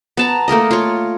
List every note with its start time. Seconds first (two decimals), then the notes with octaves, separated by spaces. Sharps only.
0.17 B3 A5 A#5
0.48 A3 A#3 A#4 D#5
0.71 F4 C#5